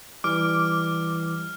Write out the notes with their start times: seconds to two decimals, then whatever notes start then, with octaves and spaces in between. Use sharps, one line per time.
0.24 E3 G3 D6 F6